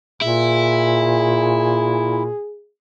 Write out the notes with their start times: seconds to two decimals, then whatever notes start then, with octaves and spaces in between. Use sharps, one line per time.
0.22 A#2 E4 G#4